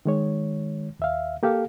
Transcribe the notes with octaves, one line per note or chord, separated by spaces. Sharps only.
D#3 G#3 C#5
D#2 E5 F5
A#3 G4 A4 F5